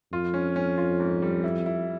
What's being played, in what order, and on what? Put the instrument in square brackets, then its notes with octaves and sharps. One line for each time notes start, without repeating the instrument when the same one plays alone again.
[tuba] F2 [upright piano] F4
[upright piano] C#4
C#4
F4
G#2
G3
E4
E4